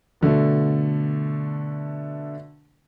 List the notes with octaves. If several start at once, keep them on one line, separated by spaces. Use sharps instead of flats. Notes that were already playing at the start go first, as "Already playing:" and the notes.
B2 D3 A3